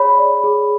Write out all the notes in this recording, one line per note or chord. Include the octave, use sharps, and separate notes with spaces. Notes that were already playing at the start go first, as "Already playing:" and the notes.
Already playing: G#4 C#5 B5
D5
G#4